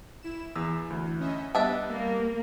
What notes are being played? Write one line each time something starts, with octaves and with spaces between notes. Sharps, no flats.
E4 E7
E2 E3 E6
D2
C#4 D#5 E5
G3 B3 D4 D#5 E5 F#5
A#3 E6